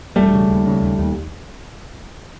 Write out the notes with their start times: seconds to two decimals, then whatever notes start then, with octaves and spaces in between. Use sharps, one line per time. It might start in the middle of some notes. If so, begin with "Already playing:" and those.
0.16 E1 G3 A3
0.32 C#3
0.50 D#2
0.66 C#3
0.83 D#2
0.99 D#2